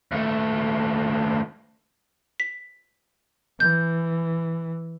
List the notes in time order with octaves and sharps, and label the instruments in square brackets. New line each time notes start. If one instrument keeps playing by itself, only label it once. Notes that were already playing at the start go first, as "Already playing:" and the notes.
[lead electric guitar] D#2 A3
[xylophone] B6
[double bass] E3 [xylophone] G6